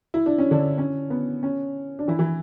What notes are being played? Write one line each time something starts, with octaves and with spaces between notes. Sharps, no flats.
E4
D4
C#4
D3 D4
C#4
B3
C#4
D4
E3 E4
E3 E4